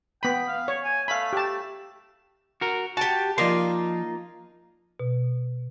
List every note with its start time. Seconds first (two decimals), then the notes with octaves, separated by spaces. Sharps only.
0.23 B3 G5 B5
0.49 F5
0.68 C#5
0.84 G#5
1.08 A3 F5 B5
1.33 G4 A5
2.61 F#4 A#4
2.97 F#4 G4 A5
3.38 F3 A#3 D#4 F4 D5 C6
4.99 B2